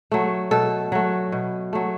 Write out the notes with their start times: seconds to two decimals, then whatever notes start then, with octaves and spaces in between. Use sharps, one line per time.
0.11 F#3 A3
0.51 B2 A4
0.92 F#3 A3
1.32 B2
1.73 F#3 A3